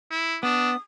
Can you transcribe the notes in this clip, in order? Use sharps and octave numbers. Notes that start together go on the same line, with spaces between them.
E4
B3 D4 D#6